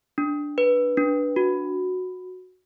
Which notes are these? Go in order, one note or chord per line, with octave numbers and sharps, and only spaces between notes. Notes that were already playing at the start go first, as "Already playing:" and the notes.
D4
B4
D4
F#4